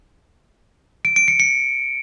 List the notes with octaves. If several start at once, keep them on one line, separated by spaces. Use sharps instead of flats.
D7
D7
C#7
C#7